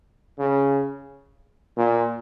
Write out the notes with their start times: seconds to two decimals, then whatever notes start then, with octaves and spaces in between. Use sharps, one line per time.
0.39 C#3
1.77 A#2